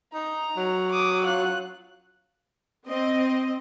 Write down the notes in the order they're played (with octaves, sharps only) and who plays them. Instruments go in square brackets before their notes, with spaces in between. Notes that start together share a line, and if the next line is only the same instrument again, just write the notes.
[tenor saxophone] D#4 [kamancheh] A#5
[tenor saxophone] F#3
[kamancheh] D6 D#6
F4 F#6
[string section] C4 D#5